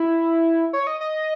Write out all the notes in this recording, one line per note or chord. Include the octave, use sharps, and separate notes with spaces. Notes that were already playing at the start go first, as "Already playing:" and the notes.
Already playing: E4
C#5
D#5
D#5